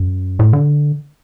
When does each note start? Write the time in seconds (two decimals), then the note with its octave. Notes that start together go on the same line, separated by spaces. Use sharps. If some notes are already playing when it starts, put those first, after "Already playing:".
Already playing: F#2
0.39 A2
0.53 D3